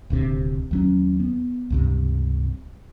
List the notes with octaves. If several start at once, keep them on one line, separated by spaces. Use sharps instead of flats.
D#1 D2 C3
D#2 F#3 C#4
B3
C#2 G2 C3